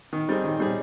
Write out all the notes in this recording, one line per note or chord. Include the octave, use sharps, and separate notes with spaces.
D#3
G3 C4 D#4 G#4
D#3
G3 C4 D#4 G#4